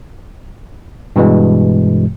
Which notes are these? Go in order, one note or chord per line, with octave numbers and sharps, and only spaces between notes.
G2 B2 E3 G#3